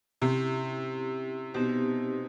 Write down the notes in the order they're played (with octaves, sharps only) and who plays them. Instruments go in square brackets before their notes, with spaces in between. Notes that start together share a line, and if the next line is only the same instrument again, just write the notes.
[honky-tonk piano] C3 [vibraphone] C#4 E4 G4
[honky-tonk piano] B2 [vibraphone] C4 D#4 G4 C5